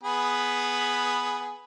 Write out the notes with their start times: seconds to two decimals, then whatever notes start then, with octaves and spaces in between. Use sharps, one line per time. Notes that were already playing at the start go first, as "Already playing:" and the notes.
0.04 B3 G#4 B5